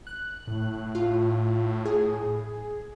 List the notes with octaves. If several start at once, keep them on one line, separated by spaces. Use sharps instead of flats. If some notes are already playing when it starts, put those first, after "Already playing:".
F#6
A2
F4
G#4